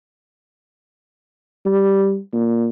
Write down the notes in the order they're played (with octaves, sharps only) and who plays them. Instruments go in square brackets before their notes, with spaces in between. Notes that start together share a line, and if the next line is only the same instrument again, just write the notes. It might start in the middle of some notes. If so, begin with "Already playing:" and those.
[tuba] G3
A#2